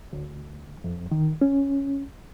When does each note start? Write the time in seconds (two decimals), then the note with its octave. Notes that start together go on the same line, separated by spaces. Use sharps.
0.13 D2
0.84 F2
1.11 D#3
1.41 C#4